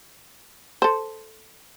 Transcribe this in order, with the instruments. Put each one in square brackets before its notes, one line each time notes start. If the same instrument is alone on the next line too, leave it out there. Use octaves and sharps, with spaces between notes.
[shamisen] A4 C5